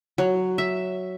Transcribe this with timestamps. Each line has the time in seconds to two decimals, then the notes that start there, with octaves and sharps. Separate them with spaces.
0.18 F#3
0.58 E5